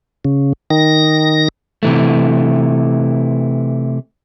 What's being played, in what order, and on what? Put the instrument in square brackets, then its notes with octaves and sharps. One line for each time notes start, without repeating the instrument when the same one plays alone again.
[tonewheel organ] C#3
D#3 A#6
[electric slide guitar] C3 E3 A3